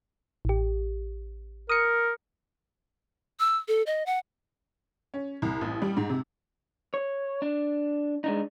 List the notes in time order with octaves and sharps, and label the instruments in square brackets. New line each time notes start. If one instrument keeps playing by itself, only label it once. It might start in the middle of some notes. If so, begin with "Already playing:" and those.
[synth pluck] A1 G4
[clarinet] A#4 [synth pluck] D#6 C#7
[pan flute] E6
A4
D#5
F#5
[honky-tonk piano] C#4
C2
A1
G3
G#2
C3
[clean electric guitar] C#5
D4
G#3 D4 D#4